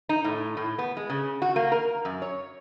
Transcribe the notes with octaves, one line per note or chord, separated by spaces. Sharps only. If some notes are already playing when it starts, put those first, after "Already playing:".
D#4
A2
A2
B3
G#3
C#3
F#4
A#3
A#4
F#2
C#5